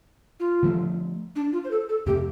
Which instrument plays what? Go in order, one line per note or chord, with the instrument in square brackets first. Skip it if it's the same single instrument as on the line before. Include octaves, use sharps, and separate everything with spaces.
[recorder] F4
[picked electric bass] D3 F3 A3
[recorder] D4
F4
C5
A4
A4
[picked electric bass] F2 C3 A3 C4 [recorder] G4